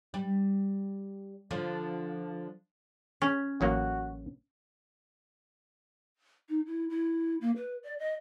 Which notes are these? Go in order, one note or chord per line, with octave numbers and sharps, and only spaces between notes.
G3
D3 F3
C#4
A1 F#3 A#3 F#4
D#4
E4
E4
A#3
B4
D5
D#5